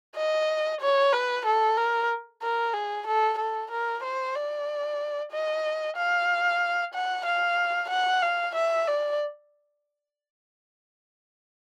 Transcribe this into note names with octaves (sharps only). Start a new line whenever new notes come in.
D#5
C#5
B4
A4
A#4
A#4
G#4
A4
A4
A#4
C5
D5
D#5
F5
F#5
F5
F#5
F5
E5
D5